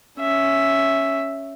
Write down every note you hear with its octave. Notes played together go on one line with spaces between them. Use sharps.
C#4 E5